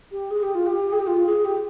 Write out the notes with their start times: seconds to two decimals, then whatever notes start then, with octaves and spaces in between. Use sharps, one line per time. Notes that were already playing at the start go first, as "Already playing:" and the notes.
0.12 G4
0.31 G#4
0.43 G4
0.55 F4
0.66 G4
0.93 G#4
0.99 G4
1.07 F4
1.26 G#4
1.45 G4